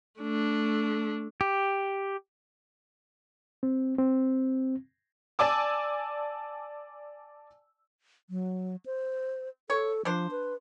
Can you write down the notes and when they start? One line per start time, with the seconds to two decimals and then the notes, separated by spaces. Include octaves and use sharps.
0.20 A3 D4
1.41 G4
3.63 C4
3.99 C4
5.39 D5 G#5 A5 D6 E6
8.30 F#3
8.86 C5
9.70 A4 C#5
10.05 F3 D4 C5
10.31 B4